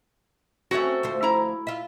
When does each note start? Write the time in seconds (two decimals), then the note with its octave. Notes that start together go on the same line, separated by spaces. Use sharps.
0.71 A3 C4 C#4 F#4 C#5
1.03 D2 F3 C5
1.23 E4 A#5
1.67 F4 E5